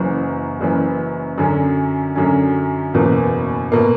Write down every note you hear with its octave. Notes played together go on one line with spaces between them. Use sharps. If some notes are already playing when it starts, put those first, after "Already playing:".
Already playing: F#1 F#2 E3
F#1 F#2 E3
F#2 D3 F#3 C#4
F#2 D3 F#3 C#4
F#1 E2 B2 A#3
B2 A#3